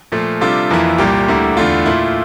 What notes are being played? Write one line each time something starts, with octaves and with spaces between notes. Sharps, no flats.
A#2 F3 A3
C3 G3 D4 F4 A4
F2 E3 A#3 E4
C2 A#2 G3 A#3 G4
D2 D3 G3 A#3 E4
E2 D3 A3 D4 F4
A#2 A3 E4